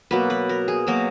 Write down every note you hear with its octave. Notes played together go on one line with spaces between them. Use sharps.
B2 F#3 A#3 B4
B4
A#4
G#4
B2 F#3 A#3 A#4